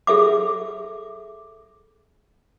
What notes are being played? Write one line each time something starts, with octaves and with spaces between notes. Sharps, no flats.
G#4 A4 E5 D6